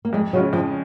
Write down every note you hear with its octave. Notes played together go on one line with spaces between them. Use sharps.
A#3
F2 G#3
C#3 F#3 G#3 C#4 F4
F2 F3